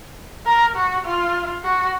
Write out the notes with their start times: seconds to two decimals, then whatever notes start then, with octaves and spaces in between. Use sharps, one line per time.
0.46 A#4
0.76 F#4
1.05 F4
1.64 F#4